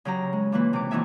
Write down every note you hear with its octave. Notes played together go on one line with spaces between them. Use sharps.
C#3 F#3 G4 A#5
G#3
A#2 E3 A#3 B4
C3 D6
F2 B2 E3 D#4 E5 G#5